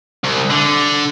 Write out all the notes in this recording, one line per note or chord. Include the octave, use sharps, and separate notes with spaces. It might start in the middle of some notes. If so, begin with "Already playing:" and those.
C2
D3